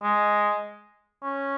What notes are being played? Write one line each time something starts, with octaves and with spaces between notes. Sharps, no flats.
G#3
C#4